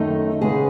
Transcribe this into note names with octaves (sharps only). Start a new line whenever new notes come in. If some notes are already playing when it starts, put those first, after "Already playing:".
Already playing: F#2 D#3 A3 D#4 A4
C#3 G#3 B3 G#4